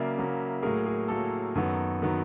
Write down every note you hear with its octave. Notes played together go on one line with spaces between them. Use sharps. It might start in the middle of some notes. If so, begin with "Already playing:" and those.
Already playing: C#3 F#3 A#3 D5 E5
C#3 F#3 A#3
A2 F#3 A#3 G#4 A#4
G#4
A2 F#3 A#3 A4
F#2 D#3 F#3 B3
D#3 F#3 B3